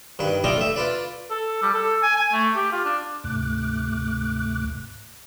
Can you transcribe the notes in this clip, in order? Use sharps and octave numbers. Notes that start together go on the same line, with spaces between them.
G2 D#3 B4
G3 D4 E4 F4 D#5 G5
A3 E5
F4 B4 D5
A4
G3
A4
G#5
G#5
A3
G4
F4
D4
D2 G#2 C3 A3 D6 F#6